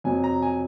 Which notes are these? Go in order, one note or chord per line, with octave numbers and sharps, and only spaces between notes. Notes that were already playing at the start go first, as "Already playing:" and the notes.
F2 C3 F#3 G#5
A#5
G#5